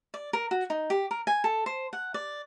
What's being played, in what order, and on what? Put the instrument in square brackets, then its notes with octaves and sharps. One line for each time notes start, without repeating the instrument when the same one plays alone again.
[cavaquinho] D5
A#4
F#4
D#4
G4
A#4
G#5
A4
C5
F#5
D5